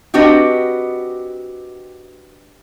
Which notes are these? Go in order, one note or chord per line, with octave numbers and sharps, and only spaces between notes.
C4 D4 F#4 G4 B4 D#5